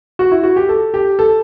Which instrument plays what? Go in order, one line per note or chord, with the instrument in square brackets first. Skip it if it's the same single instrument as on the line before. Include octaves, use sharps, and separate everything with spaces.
[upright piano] F#4
E4
F#4
G4
A4
G4
A4